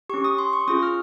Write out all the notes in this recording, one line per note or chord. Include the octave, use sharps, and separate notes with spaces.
C#4 G4 C#6
D#6
C6
C#6
C#4 F4 G#4 D#6
F6